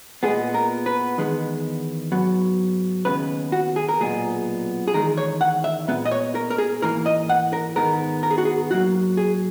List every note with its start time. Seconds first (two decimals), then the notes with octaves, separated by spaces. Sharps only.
0.23 A#2 G#3 B3 G#4
0.54 A#4
0.86 B4
1.18 E2 D#3 G#3 B3
2.12 G#2 F#3 B3
3.05 D#2 C#3 G#3 B3 B4
3.52 F#4
3.76 G#4
3.89 A#4
3.99 B1 A#2 G#3 B3 G#4
4.88 G#4
4.93 E2 D#3 G#3 A#4
5.18 C#5
5.41 F#5
5.64 E5
5.88 A#2 G#3 B3
6.06 D#5
6.11 C#5
6.35 A#4
6.50 A#4
6.58 G#4
6.82 G#2 E3 A#3 A#4
7.06 D#5
7.30 F#5
7.53 A#4
7.76 G#2 D#3 G#3 B3 A#4
8.23 A#4
8.31 G#4
8.38 F#4
8.45 G#4
8.70 G#2 F#3 A#3 F#4
9.17 G#4